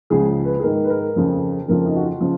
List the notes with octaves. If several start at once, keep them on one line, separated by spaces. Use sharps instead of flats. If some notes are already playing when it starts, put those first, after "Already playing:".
C#2 C#3 F3 G#4
B4
G#4
G#2 D#3 A#4
B4
A#4
F2 C#3 F3
F2 C#3 F3 A#4
D#4
F#4
F4
C#3 F3